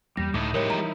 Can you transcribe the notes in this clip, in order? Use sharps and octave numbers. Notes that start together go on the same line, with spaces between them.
E2 G3 A#3 A#6
C#2 A2 D3 D#4 E4 D#5 D6
A2 F3 G3 G#3 G4 A#4 C#5 C#7
E3 F3 G3 A#5